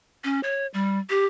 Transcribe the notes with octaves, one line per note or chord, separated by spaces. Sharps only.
C#4
C#5
G3
G4